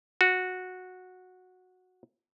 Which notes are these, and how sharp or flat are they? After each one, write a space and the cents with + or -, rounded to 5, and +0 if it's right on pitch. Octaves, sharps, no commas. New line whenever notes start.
F#4 -10